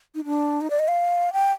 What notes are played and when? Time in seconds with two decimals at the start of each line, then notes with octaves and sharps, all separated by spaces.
0.15 D#4
0.25 D4
0.61 D#4
0.70 D5
0.79 D#5
0.88 F5
1.33 G5